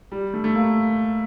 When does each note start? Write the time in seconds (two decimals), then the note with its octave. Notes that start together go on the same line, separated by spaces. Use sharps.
0.12 G3
0.34 A3
0.44 A3
0.54 A#3